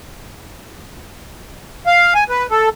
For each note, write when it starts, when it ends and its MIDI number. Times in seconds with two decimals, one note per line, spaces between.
1.87 2.14 77
2.15 2.24 80
2.29 2.47 71
2.51 2.69 69